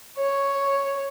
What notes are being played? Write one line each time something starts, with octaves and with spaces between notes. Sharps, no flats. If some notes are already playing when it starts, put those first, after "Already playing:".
C#5